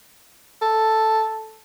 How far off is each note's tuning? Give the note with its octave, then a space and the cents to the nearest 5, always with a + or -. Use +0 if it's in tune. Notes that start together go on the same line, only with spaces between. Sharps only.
A4 +0